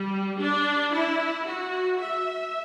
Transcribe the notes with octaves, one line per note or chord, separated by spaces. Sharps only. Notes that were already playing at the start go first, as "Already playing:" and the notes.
Already playing: G3
D4
E4
F#4
E5